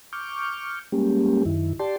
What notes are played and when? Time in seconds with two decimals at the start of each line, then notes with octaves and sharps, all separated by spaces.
0.13 C#6 D6 F6 G6
0.92 G3 G#3 A#3 C#4 G4
1.45 F#2 D#3 E4
1.79 G4 D5 G5 A5 C6